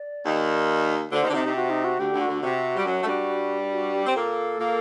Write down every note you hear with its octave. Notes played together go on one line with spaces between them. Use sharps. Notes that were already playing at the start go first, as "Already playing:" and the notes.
Already playing: D5
D#2 D#3
D2 D3 C5
D#2 D#3
D3
C3 D#4
C3
F#4
D#4
F#4
D2 D3 G4
D2 D3
F#4
D2 D3
C3 F#4
G3
F#2 F#3
A3
G2 G3
F#4
G4
C4
A#2 A#3 A4
A#2 A#3